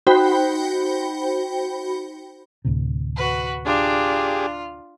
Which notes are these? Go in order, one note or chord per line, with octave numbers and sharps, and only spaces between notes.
D#4 F#4 C5 G5 B5
D2 A2 C3
F#4 B4
D4 F4 G4 G#4